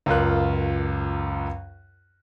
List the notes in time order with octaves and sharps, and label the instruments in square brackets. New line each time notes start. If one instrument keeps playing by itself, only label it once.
[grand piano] C#2 F#2 F4 A#4 F#6